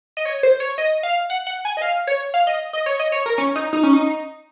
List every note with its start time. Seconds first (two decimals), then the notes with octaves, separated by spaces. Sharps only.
0.17 D#5
0.25 C#5
0.43 C5
0.60 C#5
0.78 D#5
1.03 F5
1.30 F#5
1.47 F#5
1.65 G#5
1.77 D#5
1.82 F5
2.07 C#5
2.34 F5
2.47 D#5
2.73 D#5
2.86 C#5
2.99 D#5
3.12 C#5
3.26 A#4
3.38 C#4
3.56 D#4
3.73 D#4
3.83 C#4
3.93 D#4